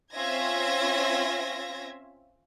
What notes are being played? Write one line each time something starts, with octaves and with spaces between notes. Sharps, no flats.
C4 C#4 F4 E5 G#6 A#6